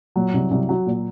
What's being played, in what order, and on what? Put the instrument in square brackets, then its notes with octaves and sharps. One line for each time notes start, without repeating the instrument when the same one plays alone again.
[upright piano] A#2 [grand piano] F#3
[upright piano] C2
C2
F#3
A#2